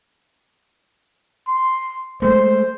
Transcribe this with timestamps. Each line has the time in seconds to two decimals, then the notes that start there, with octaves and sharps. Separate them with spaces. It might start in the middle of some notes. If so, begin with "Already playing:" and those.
1.47 C6
2.22 G#3 A3 C5